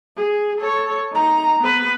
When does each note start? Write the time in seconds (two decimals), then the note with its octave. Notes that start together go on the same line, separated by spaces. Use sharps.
0.17 G#4
0.60 A4 C#5
1.13 D#4 A#5
1.60 B3 B4